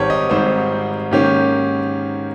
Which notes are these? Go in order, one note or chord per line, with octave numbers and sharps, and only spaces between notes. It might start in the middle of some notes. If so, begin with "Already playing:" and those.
Already playing: G#1 G#2 G3 C4 G4 A#4 C#5
D#5
G#1 G#2 G3 C4 C5
G#2 D#3 A#3 C#4 G4